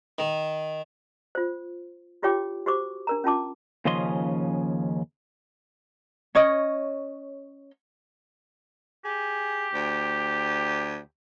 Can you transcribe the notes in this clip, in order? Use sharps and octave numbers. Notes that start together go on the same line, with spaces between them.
D#3
F4 C5
E4 F4 G4 C#5 G5 D6
F#4 G4 C5 C#6 D6
D4 A#4 A#5
C#4 F4 A5 D6
D#2 C#3 F3 C#4 D#5 C6
C#4 C#5 D#5
G4 G#4
D2